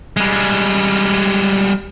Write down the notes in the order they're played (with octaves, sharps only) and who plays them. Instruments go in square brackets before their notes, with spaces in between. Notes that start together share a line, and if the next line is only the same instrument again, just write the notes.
[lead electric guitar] G3 G#3